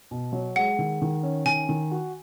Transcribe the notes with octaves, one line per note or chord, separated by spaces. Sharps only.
B2
F#3
G#3 F#5
D#3
D#3
C#4
D#3 G#5
D#3
F#4